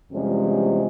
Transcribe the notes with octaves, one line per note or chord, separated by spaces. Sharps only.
E2 C3 F3 G3 G#3 C#4